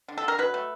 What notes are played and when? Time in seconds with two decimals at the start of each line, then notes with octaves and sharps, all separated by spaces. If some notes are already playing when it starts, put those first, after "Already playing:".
0.08 D3
0.18 A4
0.24 D3 A#4
0.38 F#3 B4
0.54 A3